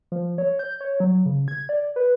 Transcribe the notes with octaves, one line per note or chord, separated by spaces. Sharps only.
F3
C#5
G6
C#5
F#3
C#3
G#6
D5
B4